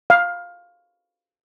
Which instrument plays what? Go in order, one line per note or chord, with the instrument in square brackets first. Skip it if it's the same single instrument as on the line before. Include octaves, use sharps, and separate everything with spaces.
[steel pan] F5